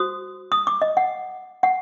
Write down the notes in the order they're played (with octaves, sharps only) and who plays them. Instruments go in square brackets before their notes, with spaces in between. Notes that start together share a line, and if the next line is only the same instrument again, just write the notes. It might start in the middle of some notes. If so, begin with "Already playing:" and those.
Already playing: [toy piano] F#4 C5 D#6
D#6
D6
D#5
F#5
F#5